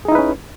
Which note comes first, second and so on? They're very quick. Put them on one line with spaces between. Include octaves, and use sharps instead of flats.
G#4 D#4 E4 B4 C#4